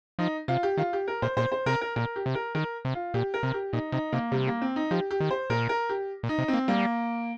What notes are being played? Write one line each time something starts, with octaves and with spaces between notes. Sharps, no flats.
F3 D#4
C3 F4
G4
D#3 F4
G4
A#4
A#2 C5
A#2 C5
C5
C3 A#4
A#4
A#2 A#4
G4
C3
A#4
D#3 A#4
C3
F4
A#2 G4
A#4
C3
G4
A#2 D#4
C3 D#4
C3 A#3
C3 G3
A#3
C4
D#4
F3 G4
G4
D#3
C5
A#2 A#4
A#4
G4
A#2
D#4
C3
C4
A#3
G3 A#3